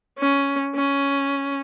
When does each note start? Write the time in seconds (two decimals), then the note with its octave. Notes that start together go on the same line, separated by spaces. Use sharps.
0.18 C#4
0.75 C#4